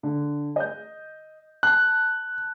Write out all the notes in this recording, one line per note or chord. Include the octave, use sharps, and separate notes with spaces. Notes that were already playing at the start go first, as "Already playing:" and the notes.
D3
D#5 G6
A5 F#6